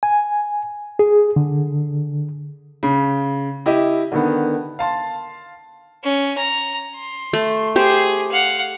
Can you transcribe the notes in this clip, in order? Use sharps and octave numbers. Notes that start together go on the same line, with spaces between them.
G#5
G#4
D3
C#3
E4 G4 D#5 E5
D3 D#3 B3
F5 A5 C6
C#4
A#5
C6
A3
G4 G#4 C5
F5 F#5